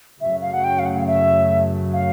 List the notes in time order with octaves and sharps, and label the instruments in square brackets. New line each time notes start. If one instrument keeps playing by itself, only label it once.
[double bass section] F#2 C#3 F#3 A3 [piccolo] E5
[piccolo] F5
F#5
G5
F5
F#5
F5
E5
F5